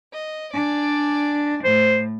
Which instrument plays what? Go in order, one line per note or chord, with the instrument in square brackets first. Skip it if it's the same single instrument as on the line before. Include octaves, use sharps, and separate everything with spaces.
[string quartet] D#5
D4 D5 G#5
[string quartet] A2 [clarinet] C5